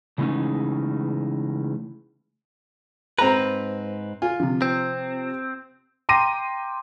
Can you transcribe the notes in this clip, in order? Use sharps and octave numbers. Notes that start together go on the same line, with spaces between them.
C#3 E3 G#3 A3 C#4 D#4
G#2 C4 B4 A#5
F4 G#5
C3 F3
C4
G5 A#5 C6 D6 A#6 D#7